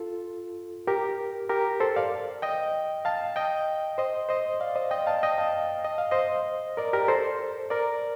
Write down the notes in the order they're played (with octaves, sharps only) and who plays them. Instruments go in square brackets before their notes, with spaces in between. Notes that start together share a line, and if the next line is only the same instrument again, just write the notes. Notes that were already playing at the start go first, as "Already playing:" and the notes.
Already playing: [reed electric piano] F4 A4
G4 A#4
G4 A#4
A4 C5
D5 F5
D#5 G5
F5 A5
D#5 G5
C5 D#5
C5 D#5
D5 F5
C5 D#5
D#5 G5
F5 A5
D#5 G5
F5 A5
D#5
F5
C5 D#5
A#4 D5
G4 A#4
A4 C5
A#4 D5